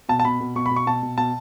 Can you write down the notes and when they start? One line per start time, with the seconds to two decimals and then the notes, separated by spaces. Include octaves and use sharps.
0.09 B2 A5
0.20 A5
0.25 B2 B5
0.40 B2
0.55 B2 C#6
0.66 B5
0.71 B2
0.76 C#6
0.87 B2 A5
1.03 B2
1.18 B2 A5